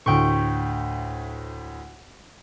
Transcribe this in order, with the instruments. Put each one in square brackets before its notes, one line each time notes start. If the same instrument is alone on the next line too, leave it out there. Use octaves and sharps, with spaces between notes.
[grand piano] D2 A2 [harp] G5 C#6